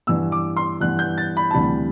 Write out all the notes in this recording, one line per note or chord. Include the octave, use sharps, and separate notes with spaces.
G2 E3 B3 E6
D6
C6
G2 E3 B3 F#6
G6
A6
B5
A5
D2 C3 E3 G3 B5